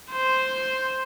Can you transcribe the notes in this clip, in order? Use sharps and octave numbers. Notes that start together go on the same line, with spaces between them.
C5